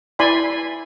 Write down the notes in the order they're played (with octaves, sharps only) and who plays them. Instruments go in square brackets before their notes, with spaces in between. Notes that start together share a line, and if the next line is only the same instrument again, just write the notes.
[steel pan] E4 D5 G#5 B5 C6